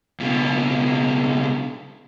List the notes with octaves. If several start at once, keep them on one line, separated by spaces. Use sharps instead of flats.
C#2 B2